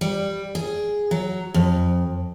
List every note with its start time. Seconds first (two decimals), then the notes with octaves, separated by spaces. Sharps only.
0.01 G3
0.55 G#4
1.11 F#3
1.54 F2